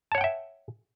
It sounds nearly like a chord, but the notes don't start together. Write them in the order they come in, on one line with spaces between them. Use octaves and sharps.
A5 C#5 F#5 G5 E5